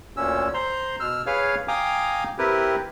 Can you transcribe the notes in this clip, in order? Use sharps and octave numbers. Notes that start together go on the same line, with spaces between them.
D2 A#2 C#4 E6
C5 A#5 C6
B2 E6 F6
G#4 B4 C#5 F5 F6
F5 G5 G#5 A#5 D6 D#6
C4 E4 G4 A#4 B4